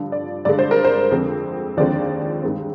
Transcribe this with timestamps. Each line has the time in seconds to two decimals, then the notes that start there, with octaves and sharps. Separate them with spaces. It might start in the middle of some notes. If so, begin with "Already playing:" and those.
Already playing: G2 D3 F3
0.12 D5
0.45 G2 D3 G#3 D5
0.59 C5
0.71 A#4
0.84 C5
1.11 F2 D3 G#3 C4
1.77 D#2 D3 F3 G#3 C4 D5
2.43 G2 D#3 G#3 C4